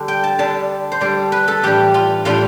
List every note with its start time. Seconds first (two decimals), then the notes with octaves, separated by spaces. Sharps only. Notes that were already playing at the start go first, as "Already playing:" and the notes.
Already playing: D3 G3 D4
0.08 G5
0.24 A5
0.39 D3 G3 D4 A5
0.92 C5
1.01 D3 G3 D4 D5
1.32 B4
1.48 A4
1.63 A2 E3 G3 D4 G4
1.94 F4
2.25 A2 E3 G3 D4 F4